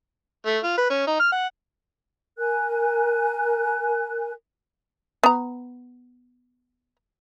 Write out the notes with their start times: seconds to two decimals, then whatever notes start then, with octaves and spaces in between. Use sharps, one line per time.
0.46 A3
0.63 F4
0.78 B4
0.90 C#4
1.07 D#4
1.20 F6
1.32 F#5
2.38 A#4 G#5 F#6
5.23 B3 A#5